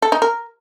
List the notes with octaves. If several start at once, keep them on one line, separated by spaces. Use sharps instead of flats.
A4
D#4
A#4